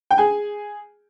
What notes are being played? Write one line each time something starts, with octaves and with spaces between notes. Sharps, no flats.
G5
G#4 G#5